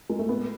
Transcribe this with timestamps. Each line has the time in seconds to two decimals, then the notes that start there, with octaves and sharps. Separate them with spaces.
0.10 G#3
0.19 A3
0.29 B3